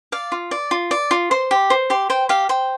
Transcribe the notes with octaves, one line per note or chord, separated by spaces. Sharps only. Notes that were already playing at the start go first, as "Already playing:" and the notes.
D5 F5
F4
D5
F4
D5
F4
C5 C6
G4
C5
G4 C6
C5 G5
G4 F5
C5 G5